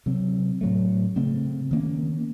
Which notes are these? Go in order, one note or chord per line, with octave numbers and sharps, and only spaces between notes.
C3 F#3 C4
A2 F#3 A3
C#3 A3 C4
D#3 A#3 C#4